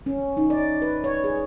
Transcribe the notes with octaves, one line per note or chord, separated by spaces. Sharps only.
C#4
D#4
D5
B4
C#5
G#4